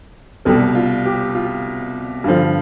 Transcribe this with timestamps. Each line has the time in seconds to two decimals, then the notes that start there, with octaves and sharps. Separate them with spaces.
0.45 C2 B2 G3 A4
0.75 F4
1.06 G4
1.35 F4
2.24 G2 D3 F3